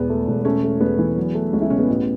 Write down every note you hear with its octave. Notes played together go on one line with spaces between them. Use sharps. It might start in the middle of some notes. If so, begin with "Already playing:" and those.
Already playing: E1 E2 B3
A3
E1
A3 C#4
A3
E2 B3
E3
F#3
A3
C#2 C#4
E4
B2 C#4
B3
A1